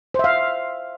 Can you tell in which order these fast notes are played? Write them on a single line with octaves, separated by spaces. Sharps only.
C5 E5 F5